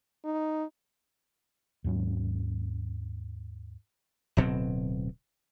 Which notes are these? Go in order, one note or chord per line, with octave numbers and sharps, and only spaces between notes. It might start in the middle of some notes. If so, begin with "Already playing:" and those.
D#4
D#2 G#2 F#3 C#4
D1 B2 F#3 C4